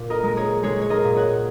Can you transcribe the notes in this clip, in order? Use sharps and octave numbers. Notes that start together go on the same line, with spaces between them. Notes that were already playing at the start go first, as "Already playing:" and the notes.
Already playing: A#2
A#4 D#5
G#3 A#4
G#4 C#5
G#3 G#4 C#5
C#5
A#4 D#5
A#2
C#5 F#5